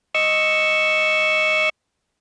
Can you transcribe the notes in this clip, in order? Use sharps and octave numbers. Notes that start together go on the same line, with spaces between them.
D#5 C#6 E6